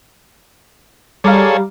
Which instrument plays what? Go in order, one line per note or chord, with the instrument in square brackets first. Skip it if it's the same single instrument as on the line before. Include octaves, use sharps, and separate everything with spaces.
[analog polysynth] G3 [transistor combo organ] G#4 A4 C#5 [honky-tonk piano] F5 A#5 D6